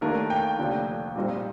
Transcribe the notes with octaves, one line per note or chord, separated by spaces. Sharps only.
D#2 D#3 A3 D4 A#4
G5
F1 D#2 D3 F3 A3
A#1 A#2 G3 C4 D#4